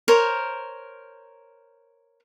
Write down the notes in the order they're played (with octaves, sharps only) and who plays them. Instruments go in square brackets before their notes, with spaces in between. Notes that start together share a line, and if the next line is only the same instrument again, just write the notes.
[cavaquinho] A#4 C5 C#5